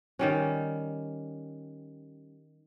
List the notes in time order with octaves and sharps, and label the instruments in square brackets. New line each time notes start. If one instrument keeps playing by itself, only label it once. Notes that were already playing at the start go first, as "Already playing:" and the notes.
[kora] D#3 G3 C#4